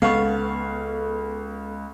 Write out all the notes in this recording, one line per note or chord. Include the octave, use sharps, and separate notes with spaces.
C#2 B3 A4 F5 C#6